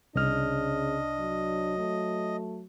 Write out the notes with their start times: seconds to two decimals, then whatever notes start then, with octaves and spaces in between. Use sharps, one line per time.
0.15 C2 C#3 D4 D#5 F6
1.19 F#3
1.78 A3